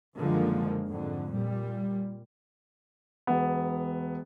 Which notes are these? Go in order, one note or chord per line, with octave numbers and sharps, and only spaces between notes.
F#2 D3 D#3 F3 G#3 A#3
F2 G#2 D3
A#2 G3
E1 B3